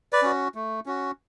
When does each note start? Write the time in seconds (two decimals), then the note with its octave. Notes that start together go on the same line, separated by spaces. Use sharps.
0.13 B4 D5
0.22 C#4 F#4
0.55 A3
0.86 C#4 F#4